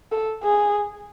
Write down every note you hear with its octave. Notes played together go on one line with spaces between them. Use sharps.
A4
G#4